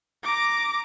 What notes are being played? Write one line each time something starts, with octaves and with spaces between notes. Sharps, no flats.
A#5 D6